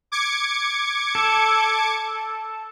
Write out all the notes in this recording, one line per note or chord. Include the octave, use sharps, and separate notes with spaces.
D6 G#6 C#7
A4